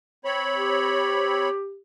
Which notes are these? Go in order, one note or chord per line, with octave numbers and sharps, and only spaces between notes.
C4 C#5 B5
G4